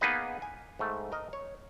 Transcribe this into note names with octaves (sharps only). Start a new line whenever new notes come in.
A#3 B3 D#4 G#4 B4 D#5
G#5
G#2 A3
A#4 D#5
C#5